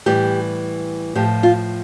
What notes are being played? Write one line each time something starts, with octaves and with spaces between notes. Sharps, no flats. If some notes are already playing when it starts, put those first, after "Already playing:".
A2 E3 G3 G4
A2 F3 G4
F4